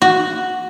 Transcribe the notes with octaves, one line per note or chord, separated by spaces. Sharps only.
F#4